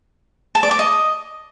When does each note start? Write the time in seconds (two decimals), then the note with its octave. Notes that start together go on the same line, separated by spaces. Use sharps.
0.55 A5
0.63 D5
0.71 D6
0.79 D#5